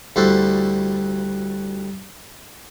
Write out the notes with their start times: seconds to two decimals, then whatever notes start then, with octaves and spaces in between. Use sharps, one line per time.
0.16 D2 G3 E4 F#4 A4 C5